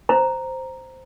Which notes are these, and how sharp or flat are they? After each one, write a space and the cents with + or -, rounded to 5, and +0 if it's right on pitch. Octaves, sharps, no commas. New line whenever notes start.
C5 +0 A#5 +0